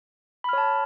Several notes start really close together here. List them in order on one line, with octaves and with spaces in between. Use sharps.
B5 F6 C#5 A5